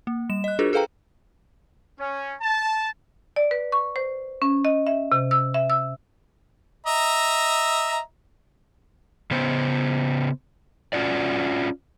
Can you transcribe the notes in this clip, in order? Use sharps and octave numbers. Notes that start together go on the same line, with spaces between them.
A#3
G3 E7
D#5 F#6
D4 F4 F#4 G#4 A#4 C5
G#4 A4 B4 F5 G5 A#5
C#4
A5
D5
B4
C#6
C5
C#4
D#5
E5
C3
E6
E5
E6
D#5 E5 A#5
C#3 B3 C5
C#4 F4 F#4 D5